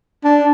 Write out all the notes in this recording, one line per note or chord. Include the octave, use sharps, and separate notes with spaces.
D4